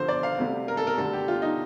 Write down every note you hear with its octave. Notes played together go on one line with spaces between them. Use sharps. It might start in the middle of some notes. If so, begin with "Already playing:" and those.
Already playing: G2 D3 F3 C5
D5
F5
D2 C3 G3
A#4
A4
A#4
D2 D3 G3 A4
G4
F4
D#4